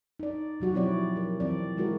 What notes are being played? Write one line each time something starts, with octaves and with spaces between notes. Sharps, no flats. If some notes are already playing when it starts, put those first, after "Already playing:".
D#4 D5
B2 F#3 F#4 G4
F3 C4 E4 F#4 C#5 D5
G4 A#4
E3 C4 D5
D#3 G#3 E4 F#4 G#4 A#4